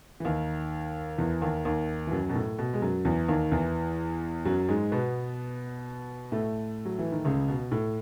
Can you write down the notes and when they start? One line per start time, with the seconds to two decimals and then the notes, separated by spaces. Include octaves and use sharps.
0.20 E3
0.25 D#2 D#3
1.18 E2 E3
1.42 D#2 D#3
1.65 D#2 D#3
2.07 E3
2.12 F#2 F#3
2.29 B2
2.35 A2
2.59 B2
2.73 G#3
2.82 F#2 F#3
3.05 E2 E3
3.28 D#2 D#3
3.52 E2 E3
4.45 F#2 F#3
4.68 G#2 G#3
4.92 B2 B3
6.32 A2 A3
6.85 F#3
6.99 E3
7.12 D#3
7.25 C#2 C#3
7.48 B2
7.72 A2